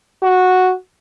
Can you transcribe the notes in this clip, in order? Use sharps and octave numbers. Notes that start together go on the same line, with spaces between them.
F#4